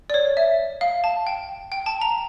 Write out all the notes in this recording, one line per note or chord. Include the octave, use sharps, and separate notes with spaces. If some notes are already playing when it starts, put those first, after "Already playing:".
D5
C#5
E5
F5
A5
G5
G5
A5
A#5